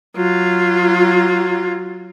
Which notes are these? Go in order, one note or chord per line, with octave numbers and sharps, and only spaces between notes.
F#3 F4